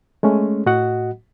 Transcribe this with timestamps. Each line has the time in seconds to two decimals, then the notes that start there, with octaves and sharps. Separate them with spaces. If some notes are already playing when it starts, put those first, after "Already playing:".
0.23 G#3 A3 C#4
0.66 A2 F#4 D#5 F#5